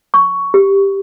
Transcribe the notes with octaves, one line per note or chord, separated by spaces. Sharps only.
C#6
G4